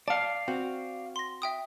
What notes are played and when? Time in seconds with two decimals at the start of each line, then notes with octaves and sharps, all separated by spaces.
0.08 D5 F5 A5 C#7
0.48 C4 F#4
1.16 C6 A#6
1.42 E5 G5 D#6